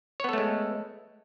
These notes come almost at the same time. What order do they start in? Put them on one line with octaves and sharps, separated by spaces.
C#5 B3 A4 A3 G#3